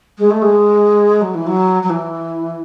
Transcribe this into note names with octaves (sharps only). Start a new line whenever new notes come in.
G#3
A3
G#3
F#3
E3
F#3
F#3
E3